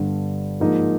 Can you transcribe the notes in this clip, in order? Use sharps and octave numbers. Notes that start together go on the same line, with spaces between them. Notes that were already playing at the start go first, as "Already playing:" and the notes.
Already playing: G1 G2 D3
G#2 F3 A#3 D#4